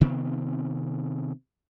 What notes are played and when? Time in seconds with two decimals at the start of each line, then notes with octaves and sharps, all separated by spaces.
0.01 C3 D#3 B3 C4